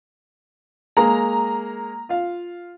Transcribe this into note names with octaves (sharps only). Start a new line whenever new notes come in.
G#3 A#3 A#5
F4 F5